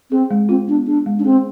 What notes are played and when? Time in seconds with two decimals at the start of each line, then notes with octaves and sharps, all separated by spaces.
0.11 C4 G#4
0.31 G#3
0.49 C4 F4
0.68 B3 D4
0.87 D4 G#4
1.06 G#3
1.19 D4
1.25 C4 G#4